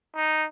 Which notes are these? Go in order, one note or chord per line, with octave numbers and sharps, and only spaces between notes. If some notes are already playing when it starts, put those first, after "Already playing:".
D#4